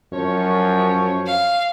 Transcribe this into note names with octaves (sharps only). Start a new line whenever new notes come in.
F#2 F3 C#5
F5